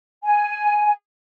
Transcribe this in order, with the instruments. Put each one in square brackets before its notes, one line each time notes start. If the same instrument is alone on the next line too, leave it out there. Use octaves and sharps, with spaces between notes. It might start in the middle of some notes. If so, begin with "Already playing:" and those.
[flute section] G#5